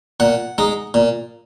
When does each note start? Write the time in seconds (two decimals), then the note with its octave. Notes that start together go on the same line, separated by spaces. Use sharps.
0.20 A#2 F#5
0.58 G#3 D#4
0.94 A#2